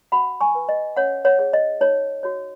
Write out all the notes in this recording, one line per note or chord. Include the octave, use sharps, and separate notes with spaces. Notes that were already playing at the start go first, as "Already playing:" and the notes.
F#4 F#5 B5
G#5 C#6
B4
D#5
C#4 C#5 F#5
C#5 F#5
G#4 C#5
D#5
D#4 C#5
F#4 C#5